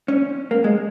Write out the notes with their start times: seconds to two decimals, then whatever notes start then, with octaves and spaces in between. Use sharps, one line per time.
0.08 C#4
0.51 A#3
0.64 G#3